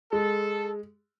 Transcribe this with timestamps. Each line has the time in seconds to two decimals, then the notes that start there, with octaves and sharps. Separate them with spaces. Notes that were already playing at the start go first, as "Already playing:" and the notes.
0.12 G#3 A4